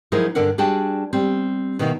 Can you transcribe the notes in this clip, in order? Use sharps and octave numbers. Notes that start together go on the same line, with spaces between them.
F3 F#3 D#4 E4 G#4 A#4
G2 D3 D4 A4 A#4 F#5
G3 D4 F#4 G#4 G5 A5
G3 C4
B2 D#3 A#3 B3 D#4 E5